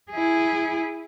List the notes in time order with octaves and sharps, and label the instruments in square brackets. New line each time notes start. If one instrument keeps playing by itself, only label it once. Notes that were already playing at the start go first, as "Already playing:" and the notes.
[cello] E4 G#4